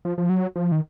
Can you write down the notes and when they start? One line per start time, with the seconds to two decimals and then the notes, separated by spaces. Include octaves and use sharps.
0.05 F3
0.18 F3
0.29 F#3
0.56 F3
0.72 D#3